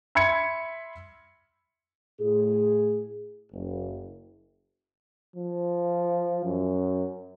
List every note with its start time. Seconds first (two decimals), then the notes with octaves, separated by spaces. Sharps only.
0.15 E5 B5 C6 G#6 C#7
2.19 A2 G#4
3.53 F#1
5.36 F3
6.45 F#2